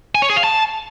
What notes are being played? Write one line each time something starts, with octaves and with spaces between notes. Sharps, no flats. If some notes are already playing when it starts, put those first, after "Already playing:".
G#5
C#5
G#4
F5
A5